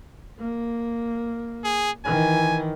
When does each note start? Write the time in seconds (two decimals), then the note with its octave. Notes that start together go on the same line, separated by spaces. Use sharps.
0.40 A#3
1.64 G#4
2.05 D#3 E3 G#5